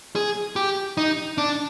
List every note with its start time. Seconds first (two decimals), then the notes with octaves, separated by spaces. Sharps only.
0.16 G#4
0.56 G4
0.97 D#4
1.38 D4